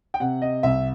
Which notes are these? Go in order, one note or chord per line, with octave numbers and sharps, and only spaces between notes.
G5
C3 F#5
D#5
C2 E5